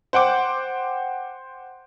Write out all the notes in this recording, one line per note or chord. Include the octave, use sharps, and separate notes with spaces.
C5 F#5 G5 D6